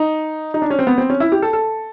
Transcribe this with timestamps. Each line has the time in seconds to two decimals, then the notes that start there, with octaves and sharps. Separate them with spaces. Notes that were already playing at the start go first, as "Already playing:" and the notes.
Already playing: D#4
0.54 D#4
0.62 D4
0.70 C#4
0.79 C4
0.87 B3
0.98 C4
1.10 C#4
1.20 E4
1.32 G4
1.42 A4
1.53 A4